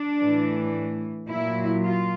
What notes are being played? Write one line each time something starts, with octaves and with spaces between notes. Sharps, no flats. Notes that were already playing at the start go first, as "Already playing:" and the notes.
Already playing: D4
A2 E3
A#2 F#3 E4
F4